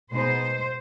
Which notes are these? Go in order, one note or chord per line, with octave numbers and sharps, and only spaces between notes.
B2 G#3 B3 D#4 C5